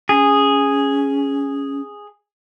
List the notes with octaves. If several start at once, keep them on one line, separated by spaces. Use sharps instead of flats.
C#4 G#4